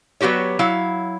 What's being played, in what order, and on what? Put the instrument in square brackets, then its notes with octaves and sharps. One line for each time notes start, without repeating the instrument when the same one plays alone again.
[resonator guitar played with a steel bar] F#3 B3 F#4 G4 C#5
F#3 E4 F5